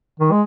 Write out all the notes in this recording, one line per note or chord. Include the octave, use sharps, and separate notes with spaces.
D#3
G#3